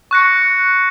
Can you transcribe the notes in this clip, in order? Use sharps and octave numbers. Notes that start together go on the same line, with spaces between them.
C#6 F#6 A#6 C#7